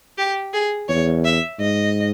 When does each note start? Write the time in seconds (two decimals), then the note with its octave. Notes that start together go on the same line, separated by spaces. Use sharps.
0.18 G4
0.53 G#4
0.89 E2 C#5
1.25 E5
1.60 G#2 D#5